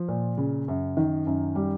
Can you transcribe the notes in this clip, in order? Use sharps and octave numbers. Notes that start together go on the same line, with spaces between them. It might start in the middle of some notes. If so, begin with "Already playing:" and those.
Already playing: F3
A#2
C#3
F#2
D#3
F#2
G3